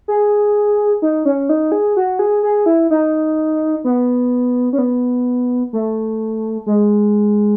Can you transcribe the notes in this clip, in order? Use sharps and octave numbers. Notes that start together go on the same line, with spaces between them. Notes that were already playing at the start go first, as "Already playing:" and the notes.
G#4
D#4
C#4
D#4
G#4
F#4
G#4
G#4
E4
D#4
B3
C#4
B3
A3
G#3